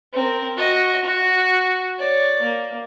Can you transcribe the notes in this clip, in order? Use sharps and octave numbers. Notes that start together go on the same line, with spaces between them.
C4 A#4
F#4 D#5
F#4
C#5 D5
A#3